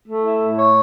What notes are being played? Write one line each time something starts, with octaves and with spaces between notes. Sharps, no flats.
A3
E4
A2
C#5